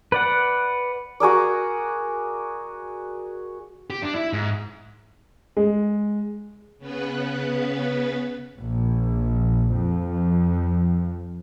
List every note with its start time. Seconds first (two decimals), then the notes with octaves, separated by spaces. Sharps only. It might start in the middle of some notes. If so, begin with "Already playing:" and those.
0.12 B4 D5 F#5
1.20 F#4 G#4 A#4 D5
3.90 G4
4.03 D4
4.15 E4
4.33 G#2
5.57 G#3
6.79 C#3 B3 B4
8.58 A#1
9.74 F2